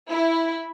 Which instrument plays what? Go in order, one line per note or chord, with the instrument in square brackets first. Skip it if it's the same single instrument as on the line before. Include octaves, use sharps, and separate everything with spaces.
[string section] E4